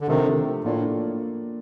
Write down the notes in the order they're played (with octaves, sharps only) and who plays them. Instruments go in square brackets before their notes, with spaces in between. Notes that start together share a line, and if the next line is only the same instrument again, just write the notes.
[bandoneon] D3
[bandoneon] C3 D#3 [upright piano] F3 A3 D4 A4
[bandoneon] A2 [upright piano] A#3 D4 F4 A4 D5